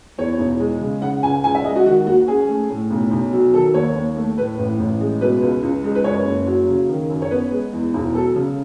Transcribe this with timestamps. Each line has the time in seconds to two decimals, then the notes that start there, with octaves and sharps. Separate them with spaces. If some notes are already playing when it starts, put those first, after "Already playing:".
0.18 E2 C#5
0.39 E1
0.60 G#3
0.81 C#3
1.02 C#3 F#5
1.23 C#2 G#5
1.44 C#2 G#5
1.55 E5
1.65 G#3 D#5
1.76 F#4
1.86 D#3 F#4
2.07 D#2 F#4
2.28 C#4 G#4
2.49 A3
2.70 A2
2.91 B1
3.11 B1
3.33 F#3
3.54 D#3 A4
3.74 D#2 C#5
3.95 D#2
4.16 A3
4.37 A2 B4
4.58 A1
4.79 A1
5.01 G#3
5.21 B2 B4
5.42 C#2
5.63 C#2
5.84 G#3
5.95 B4
6.04 F#2 C#5
6.26 F#1
6.47 F#3
6.68 C#3
6.89 D#3
7.10 F#2
7.22 C#5
7.31 B3 B4
7.52 G#3
7.73 E2
7.94 E1
8.14 F#3 A4
8.36 C#3